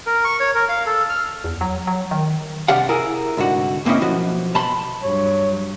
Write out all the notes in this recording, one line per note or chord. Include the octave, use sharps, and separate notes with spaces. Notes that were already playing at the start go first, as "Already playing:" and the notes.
A#4
C#6
C#5
A#4
F5
A4
F6
E2
F#3
F#3
D#3
G2 C3 G4 D5 F5 F#5
E4 G#4 A#4
C2 G#2 D3 F#4
G#2 A#3 C4 C#4 E4 D#5
B1 F3 F#4
B2 A5 B5 C6
G2 F#3 C#5